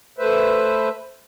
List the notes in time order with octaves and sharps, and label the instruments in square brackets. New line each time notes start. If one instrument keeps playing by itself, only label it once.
[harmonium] A3 B4 C5 E5